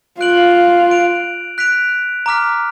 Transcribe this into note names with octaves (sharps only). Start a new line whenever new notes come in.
F4 F#6 D7 F#7
F#6 D7 F7
F#6 B6 D7 F7
A#5 D6 F6 B6